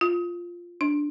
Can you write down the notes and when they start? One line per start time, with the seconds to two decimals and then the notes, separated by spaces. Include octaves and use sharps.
0.01 F4
0.81 D4